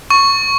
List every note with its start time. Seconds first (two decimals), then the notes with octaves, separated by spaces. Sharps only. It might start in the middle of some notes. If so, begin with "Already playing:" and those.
0.10 C#6